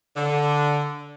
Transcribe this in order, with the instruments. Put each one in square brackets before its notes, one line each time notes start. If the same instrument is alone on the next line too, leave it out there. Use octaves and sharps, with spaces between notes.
[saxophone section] D3